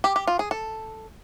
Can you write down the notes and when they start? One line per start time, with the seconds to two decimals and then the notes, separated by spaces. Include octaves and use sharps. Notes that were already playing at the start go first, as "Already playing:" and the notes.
0.04 G4
0.16 G4
0.27 F4
0.39 G#4
0.51 A4